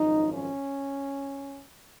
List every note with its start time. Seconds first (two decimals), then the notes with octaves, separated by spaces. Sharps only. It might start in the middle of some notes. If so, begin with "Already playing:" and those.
Already playing: G#1 F#2 F3 D#4
0.32 C#4